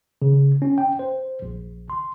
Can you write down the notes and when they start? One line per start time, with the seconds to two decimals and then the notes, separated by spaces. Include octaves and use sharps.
0.22 C#3
0.62 C#4
0.78 G5
0.99 C5
1.42 A#1
1.90 C6